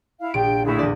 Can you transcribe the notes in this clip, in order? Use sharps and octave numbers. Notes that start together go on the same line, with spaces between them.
E4 F5
A#1 G5 D7
A2 D3 E4 G#4
E2 D3 D5